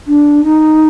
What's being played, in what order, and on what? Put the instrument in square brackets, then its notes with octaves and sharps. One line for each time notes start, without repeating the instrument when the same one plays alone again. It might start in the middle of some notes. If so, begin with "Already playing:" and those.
[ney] D4
D#4